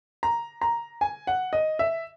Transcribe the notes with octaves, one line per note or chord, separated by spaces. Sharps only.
A#5
A#5
G#5
F#5
D#5
E5